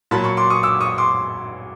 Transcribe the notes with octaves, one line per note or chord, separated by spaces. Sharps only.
A#2 F#3 A5 B5
B5 C#6
C6 D6
C#6 D#6
D6 E6
C#6 D#6
C6 D6